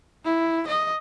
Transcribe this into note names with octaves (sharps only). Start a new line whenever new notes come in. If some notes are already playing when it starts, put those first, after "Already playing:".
E4
D#5